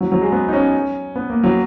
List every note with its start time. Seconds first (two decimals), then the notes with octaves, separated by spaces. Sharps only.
0.01 F#3
0.12 F#3
0.22 G#3
0.32 B3
0.49 D#4
0.53 C#4
1.16 B3
1.30 A#3
1.44 F#3